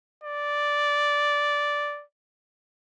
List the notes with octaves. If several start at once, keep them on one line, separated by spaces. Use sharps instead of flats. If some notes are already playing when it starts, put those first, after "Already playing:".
D5